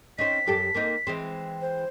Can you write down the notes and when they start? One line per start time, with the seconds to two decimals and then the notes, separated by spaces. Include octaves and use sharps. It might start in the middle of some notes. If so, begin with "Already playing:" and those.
0.18 C4 C#4 D#4 B6
0.47 F#2 G4 A4
0.74 A#3 C4 D#4
1.07 E3 G#3 C4
1.61 C5